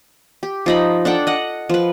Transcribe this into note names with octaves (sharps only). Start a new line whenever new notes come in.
G4
F3 D#4 B5
D4 A4 F#5 G5
D#5 F#5
F3 B4